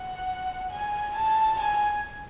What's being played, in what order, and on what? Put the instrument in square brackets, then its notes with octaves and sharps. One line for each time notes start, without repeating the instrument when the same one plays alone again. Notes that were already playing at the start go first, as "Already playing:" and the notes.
Already playing: [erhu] F#5
G#5
A5
G#5